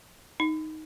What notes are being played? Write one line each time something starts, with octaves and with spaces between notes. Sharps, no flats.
D#4